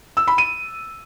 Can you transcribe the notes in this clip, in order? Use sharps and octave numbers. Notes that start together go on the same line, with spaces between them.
E6
B5
D#7